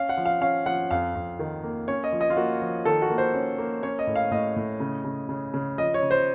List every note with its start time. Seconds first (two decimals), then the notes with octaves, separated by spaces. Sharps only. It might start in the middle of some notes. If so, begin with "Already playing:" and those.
Already playing: C#4 F5
0.09 F#5
0.17 F3
0.25 F5
0.41 C#4 F5
0.66 F3 F#5
0.91 F2 F5
1.15 F2
1.39 D#3
1.64 A#3
1.88 C#4 C#5
2.04 D#5
2.12 F3
2.21 D#5
2.30 F4
2.37 A#3 F#4
2.62 F3
2.85 D#3 A4
3.02 F#4
3.10 A#3
3.18 C5
3.34 C#4
3.58 A#3
3.83 C#4 C#5
3.99 D#5
4.07 A2
4.15 F5
4.31 A2 D#5
4.56 A2
4.80 C#3
5.05 C#3
5.29 C#3
5.54 C#3
5.78 F3 D#5
5.94 C#5
6.02 C#3
6.11 C5